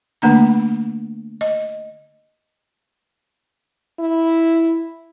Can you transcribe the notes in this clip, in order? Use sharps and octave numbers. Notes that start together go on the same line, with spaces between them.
D3 A3 A#3 D4 A#5
D#5
E4